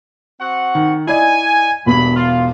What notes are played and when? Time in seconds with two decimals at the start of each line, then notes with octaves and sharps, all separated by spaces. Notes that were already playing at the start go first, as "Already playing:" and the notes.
0.40 C4 F#4 F#5
0.75 D#3
1.07 E4 D5 D#5 G#5
1.86 E1 E2 G2 B5
2.16 F4